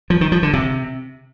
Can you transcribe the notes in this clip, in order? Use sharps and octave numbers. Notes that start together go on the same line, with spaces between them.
F3
D#3
F3
D3
C3